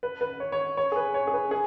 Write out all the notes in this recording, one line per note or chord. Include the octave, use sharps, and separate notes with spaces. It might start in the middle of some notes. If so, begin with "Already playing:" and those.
B4
B4
C#5
C#5
C#5
G#4
B4
C#5
G#4
B4
G#4